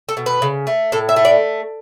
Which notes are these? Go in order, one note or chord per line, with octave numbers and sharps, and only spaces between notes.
A4
B2
B4
C#3
A3
A2 A4
E5
A3
D5